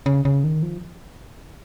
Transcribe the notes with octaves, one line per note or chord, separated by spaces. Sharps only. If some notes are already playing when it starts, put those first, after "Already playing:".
C#3
C#3
D#3
F3